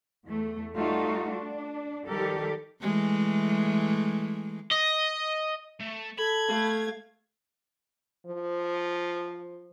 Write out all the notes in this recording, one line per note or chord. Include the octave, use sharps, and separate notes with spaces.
E2 A3
G3 A3 D#4 F4 F#4
D4
D#3 F3 G3 G4 A4 A#4
E3 G#3 A3
D#5
A3
A4 B5 G#6
A3 F5
F3